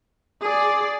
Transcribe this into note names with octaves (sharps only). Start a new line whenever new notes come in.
G#4 D5